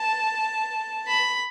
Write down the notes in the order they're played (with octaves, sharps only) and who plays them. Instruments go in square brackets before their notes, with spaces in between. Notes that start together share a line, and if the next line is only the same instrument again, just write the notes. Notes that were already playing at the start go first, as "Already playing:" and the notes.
Already playing: [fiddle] A5
B5